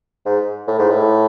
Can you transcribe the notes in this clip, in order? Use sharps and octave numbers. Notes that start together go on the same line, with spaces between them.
G#2
A2
G#2
A2